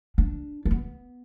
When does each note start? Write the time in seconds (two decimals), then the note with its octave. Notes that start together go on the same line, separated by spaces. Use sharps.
0.18 D4
0.65 D4
0.71 B3